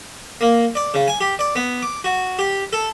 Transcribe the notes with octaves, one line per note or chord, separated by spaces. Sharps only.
A#3
D5
C#3
G#5
G4
D5
B3
D6
F#4
G4
A4